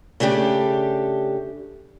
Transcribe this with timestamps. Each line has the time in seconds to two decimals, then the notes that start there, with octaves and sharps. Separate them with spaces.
0.20 C#3 A3 D4 G4 A4